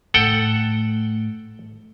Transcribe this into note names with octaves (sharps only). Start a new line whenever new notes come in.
A2 A4 F#5 G5